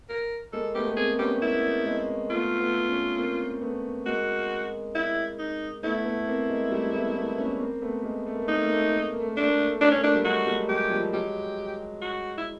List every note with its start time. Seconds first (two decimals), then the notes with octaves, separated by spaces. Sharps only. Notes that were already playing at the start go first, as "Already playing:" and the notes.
0.09 A#4
0.53 G#3 A#3 A4
0.75 A3 B3 G4
0.87 B3
0.96 A#3 C4 G#4
1.18 B3 C#4 G4
1.41 A#3 C4 E4
1.85 G#3 A#3
2.30 A3 B3 F4
2.59 A3 B3
2.89 B3 C#4
3.17 A#3 C4
3.62 A3 B3
4.06 G#3 A#3 F#4
4.95 E4
5.38 D#4
5.83 A3 B3 E4
6.05 A3 B3
6.27 A#3 C4
6.49 G#3 A#3
6.71 G3 A3
6.93 A3 B3
7.15 A3 B3
7.38 B3 C#4
7.60 A#3 C4
7.82 A3 B3
8.04 G#3 A#3
8.26 A3
8.34 A#3
8.42 A3
8.48 A#3 D#4
8.57 A3
8.65 A#3
8.72 A3
8.81 A#3
8.88 A3
8.97 A#3
9.04 A3
9.12 A#3
9.20 A3
9.28 A#3
9.36 A3 D4
9.44 A#3
9.52 A3
9.59 A#3
9.67 A3
9.75 A#3
9.81 A3 D4
9.91 A#3 C#4
9.99 A3
10.03 A#3 D4
10.15 G3 A3
10.24 F#3 G#3 F#4
10.46 G3 A3
10.69 F#3 G#3 G4
10.90 F3 G3
11.12 F#3 G#3 G4
12.02 F#4
12.38 E4